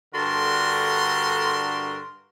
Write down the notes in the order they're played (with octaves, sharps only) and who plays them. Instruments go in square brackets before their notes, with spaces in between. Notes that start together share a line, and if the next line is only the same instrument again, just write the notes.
[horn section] G2 D3 F#4 A4 A#4 C6